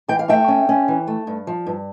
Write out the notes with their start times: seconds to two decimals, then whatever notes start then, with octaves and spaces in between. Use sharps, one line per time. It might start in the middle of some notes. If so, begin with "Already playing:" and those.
0.08 E3 G5
0.19 F5
0.28 A3 E5 G5
0.48 C#4
0.69 C#4
0.88 E3
1.07 A3
1.27 G2
1.47 F3
1.67 G2